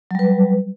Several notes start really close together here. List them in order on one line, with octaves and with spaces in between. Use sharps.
F#3 G3 B4